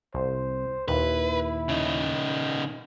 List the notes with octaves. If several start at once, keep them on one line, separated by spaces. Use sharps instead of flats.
C2 C5
D#2 A#2 D#3 E4 B4
C#3 D#4